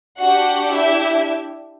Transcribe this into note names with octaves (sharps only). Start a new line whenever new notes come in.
D4 F#4 G4 F#5
E4 E5